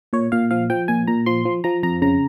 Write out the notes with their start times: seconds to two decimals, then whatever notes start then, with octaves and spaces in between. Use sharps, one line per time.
0.13 A#2 C#5
0.32 A#2 F5
0.51 F3 F5
0.70 F3 G5
0.88 A#2 G#5
1.07 A#2 A#5
1.26 F3 C6
1.45 F3
1.64 F3 A#5
1.83 F2 A#5
2.02 C#3 A#5